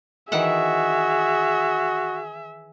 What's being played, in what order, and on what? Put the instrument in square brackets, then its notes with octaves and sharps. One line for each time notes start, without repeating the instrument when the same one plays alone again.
[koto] D#3 E3 F#5 [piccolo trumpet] F#4 [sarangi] G#4 [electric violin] E5